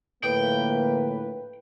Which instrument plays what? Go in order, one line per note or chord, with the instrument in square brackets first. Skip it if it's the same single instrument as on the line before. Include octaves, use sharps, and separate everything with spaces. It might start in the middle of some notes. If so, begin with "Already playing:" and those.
[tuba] A2 [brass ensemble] D3 F3 A#3 [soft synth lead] B4 [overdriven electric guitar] G5